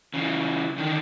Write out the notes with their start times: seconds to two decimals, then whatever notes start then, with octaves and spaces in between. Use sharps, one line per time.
0.14 C#3 E3
0.78 D3 D#3